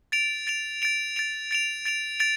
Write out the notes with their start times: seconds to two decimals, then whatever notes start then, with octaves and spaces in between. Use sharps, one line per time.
0.12 A6 D7 F7
0.47 A6 D7 F7
0.82 A6 D7 F7
1.16 A6 D7 F7
1.51 A6 D7 F7
1.85 A6 D7 F7
2.20 A6 D7 F7